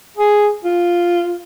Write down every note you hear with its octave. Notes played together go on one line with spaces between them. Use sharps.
G#4
F4